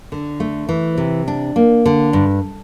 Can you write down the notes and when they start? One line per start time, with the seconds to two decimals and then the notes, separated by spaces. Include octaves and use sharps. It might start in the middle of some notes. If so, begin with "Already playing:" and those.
0.12 D3
0.40 A3
0.69 E3
0.97 C3
1.28 D4
1.56 A#3
1.86 D3
2.13 G2